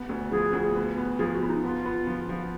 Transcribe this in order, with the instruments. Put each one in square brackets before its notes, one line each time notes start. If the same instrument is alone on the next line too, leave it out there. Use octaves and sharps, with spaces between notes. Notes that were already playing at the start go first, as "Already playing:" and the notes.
Already playing: [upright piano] B3
D2
[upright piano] F3 [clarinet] G#4
[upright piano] D2
B3
B3
[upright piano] F3 [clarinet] G#4
[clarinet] F#4
[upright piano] B3
[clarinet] D#4
[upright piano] B3 [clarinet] F4
[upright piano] B3
F3
F3